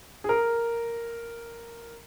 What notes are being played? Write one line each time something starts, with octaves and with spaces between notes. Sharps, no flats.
G#4
A#4